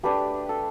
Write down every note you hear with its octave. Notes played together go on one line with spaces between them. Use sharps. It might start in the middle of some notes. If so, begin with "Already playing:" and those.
A3 D4 G4 B4
A4